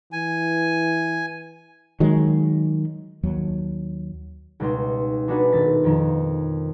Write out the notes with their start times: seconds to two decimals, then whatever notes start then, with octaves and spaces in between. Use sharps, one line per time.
0.12 E3 G#5
2.00 D#3 F#3 G#3
3.23 D#2 F#3
4.60 C#2 B2 G3 D#4 C6
5.27 B3 D4 D#4 F#4 G#4 B4
5.52 D#1 A4 A6 B6
5.84 F2 D#3